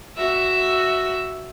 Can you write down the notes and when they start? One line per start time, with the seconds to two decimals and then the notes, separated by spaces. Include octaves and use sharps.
0.17 F#4 E5